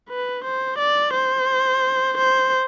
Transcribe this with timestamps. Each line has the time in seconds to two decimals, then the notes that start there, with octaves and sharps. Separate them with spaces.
0.10 B4
0.44 C5
0.78 D5
1.13 C5
2.18 C5